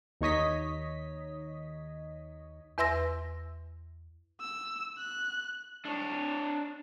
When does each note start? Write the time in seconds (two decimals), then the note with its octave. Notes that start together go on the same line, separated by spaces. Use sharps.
0.21 D#2 D#4 C#5 D#5 B6
2.78 E2 B4 E5 C6 E6 A#6
4.41 E6
4.98 F#6
5.85 D4 C#5